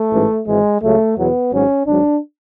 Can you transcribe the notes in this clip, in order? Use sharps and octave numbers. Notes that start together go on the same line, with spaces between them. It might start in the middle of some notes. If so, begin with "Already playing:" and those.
Already playing: A3
A1 G#2 E3
G#1 G#2 E3 G#3
C#2 C#3 F#3 A3
E2 B2 F#3 B3
G#1 G#2 F#3 C#4
G#1 G#2 F#3 D4